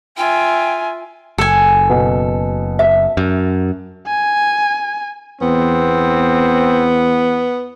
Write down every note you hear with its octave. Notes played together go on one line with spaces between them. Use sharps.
F4 E5 G5 G#5
F#1 A4 G#5
B2
E5
F#2
G#5
E2 B3 C4